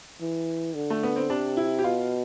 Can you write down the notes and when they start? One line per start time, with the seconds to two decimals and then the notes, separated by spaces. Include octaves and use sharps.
0.21 E3
0.75 D3
0.90 A3
1.03 B3
1.16 C4
1.30 C3 D4
1.57 E4
1.79 G4
1.84 B2 F4